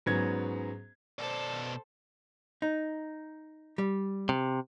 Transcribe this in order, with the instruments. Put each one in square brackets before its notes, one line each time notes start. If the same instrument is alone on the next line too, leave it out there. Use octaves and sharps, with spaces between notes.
[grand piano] G#2 F#3 B3 C#4 G#6
[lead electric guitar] B2 D5 [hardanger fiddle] A4 C5
[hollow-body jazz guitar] D#4
G3
[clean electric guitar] C3